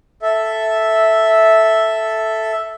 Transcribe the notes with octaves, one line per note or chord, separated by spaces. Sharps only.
A4 E5